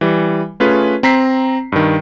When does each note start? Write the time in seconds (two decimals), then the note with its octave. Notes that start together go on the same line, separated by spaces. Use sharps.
0.01 E3 G3
0.60 A3 C#4 F4 G#4 B4
1.03 C4 A#5 B6 C7
1.72 G2 D#3